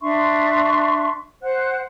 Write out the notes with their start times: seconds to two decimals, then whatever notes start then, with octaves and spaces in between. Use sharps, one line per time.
0.01 D4 E5 C6 C#6
1.42 C5 F#5 F#6